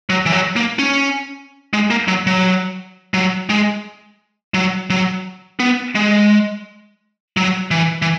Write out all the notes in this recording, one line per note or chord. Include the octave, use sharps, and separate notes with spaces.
F#3
E3
F#3
A#3
C#4
G#3
A#3
F#3
F#3
F#3
G#3
F#3
F#3
B3
G#3
F#3
E3
E3